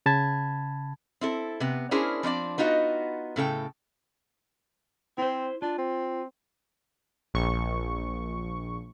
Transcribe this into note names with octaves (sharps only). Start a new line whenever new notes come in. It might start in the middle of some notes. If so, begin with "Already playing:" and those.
C#3 A5 B5 G#6
C4 E4 A4
C3 B3
C#4 D4 E4 G#4 A#4 C5
F3 C4 D4 D5
B3 D#4 F4 F#4 D#5
A2 C#3 A4 G5
C4 E4 C5
D4 F4
C4
A#1 C#6